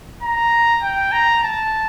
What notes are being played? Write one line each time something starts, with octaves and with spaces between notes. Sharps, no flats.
A#5
G5
A#5
A5